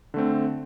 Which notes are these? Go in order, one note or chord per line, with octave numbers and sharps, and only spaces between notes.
D3 A3 C4